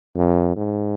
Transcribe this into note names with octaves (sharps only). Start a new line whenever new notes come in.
F2
G#2